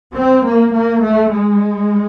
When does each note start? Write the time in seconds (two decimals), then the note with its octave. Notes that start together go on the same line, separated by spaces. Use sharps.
0.15 C4
0.44 A#3
0.73 A#3
1.01 A3
1.30 G#3